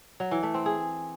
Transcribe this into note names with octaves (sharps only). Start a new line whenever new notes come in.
F#3
E3
A3
C4
G#4